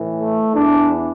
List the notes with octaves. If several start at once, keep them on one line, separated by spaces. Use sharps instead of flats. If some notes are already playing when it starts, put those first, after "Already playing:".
Already playing: A2 E3
A3
E2 E3 D4